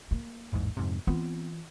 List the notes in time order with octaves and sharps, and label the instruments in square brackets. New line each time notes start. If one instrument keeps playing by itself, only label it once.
[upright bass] A#3
[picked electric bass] A1 E2 G#2
F2 G#2 C3
[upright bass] E3 F4 [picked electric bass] B3 C4